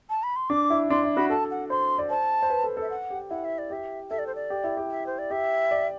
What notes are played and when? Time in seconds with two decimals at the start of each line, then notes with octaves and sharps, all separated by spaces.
0.10 A5
0.23 B5
0.36 C6
0.50 D4 D6
0.70 E4
0.90 D4 C6
1.04 E4
1.17 F#4 B5
1.30 A4 A5
1.51 F#5
1.70 C5 C6
1.99 D5
2.10 C5 A5
2.42 C5
2.50 B4
2.64 A4
2.77 A4 E5
2.90 F#5
3.10 G4
3.30 E4 F#5
3.44 E5
3.58 D5
3.70 G4 E5
4.11 A4 E5
4.19 D5
4.27 C5
4.35 D5
4.50 G4
4.64 E4
4.77 G4
4.91 E5
5.06 C5
5.19 D5
5.30 G4 E5
5.71 D5